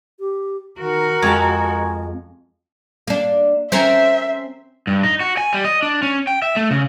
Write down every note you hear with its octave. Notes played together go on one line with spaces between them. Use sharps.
G4
D#3 F#4 A#4
F2 G#3 A5 A#5 C#6 G#6
A#3 D4
C4 C#4 A#4 E5
G2
D#4
F#4
G#5
G3
D#5
D4
C#4
G5
E5
A3
C#3